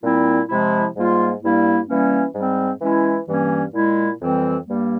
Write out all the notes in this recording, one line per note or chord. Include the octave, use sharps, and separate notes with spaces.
A#2 G3 C4 E4
C3 F3 G#3 E4
G#2 G3 A#3 F4
G2 G3 A#3 E4
E3 G3 A#3 C#4
G#2 G3 C4
E3 G#3 C#4 E4
G2 E3 G3 A#3 C#4
A#2 G#3 E4
F2 E3 G3 C4
G2 G3 A#3